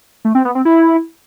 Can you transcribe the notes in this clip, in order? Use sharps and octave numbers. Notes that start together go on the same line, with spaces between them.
A3
C4
B3
C4
E4